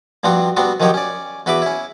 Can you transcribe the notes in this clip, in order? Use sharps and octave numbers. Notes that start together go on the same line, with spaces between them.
G2 F3 G3 C4 F#4
G3 B3 C4 D4 F#4
D#3 F3 F#3 D#4 G4 C#5
C#4 D5
E2 F#4 B4 E5 B5 D6
C#4 E4